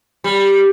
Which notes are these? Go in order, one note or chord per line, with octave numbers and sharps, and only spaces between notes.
G3